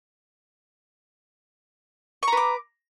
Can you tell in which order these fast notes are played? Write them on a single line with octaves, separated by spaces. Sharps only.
C#6 A#5 B4 D6